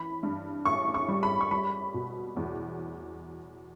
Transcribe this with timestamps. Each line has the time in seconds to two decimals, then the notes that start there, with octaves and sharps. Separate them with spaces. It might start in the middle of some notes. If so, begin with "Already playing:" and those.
Already playing: E3 B5
0.23 G2
0.65 A1 C#6
0.94 C#6
1.08 G3
1.23 B5
1.41 C#6
1.51 G3 B5
1.94 B2
2.37 E2